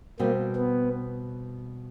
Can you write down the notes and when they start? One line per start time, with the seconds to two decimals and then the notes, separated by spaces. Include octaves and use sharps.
0.19 B2 G3 A#3 C4
0.56 B3